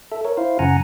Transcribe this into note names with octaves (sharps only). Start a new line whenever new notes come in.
A4 E5
A#4 C#5
E4 C5 F5
F#2 C#3 F#5 G#5 A#5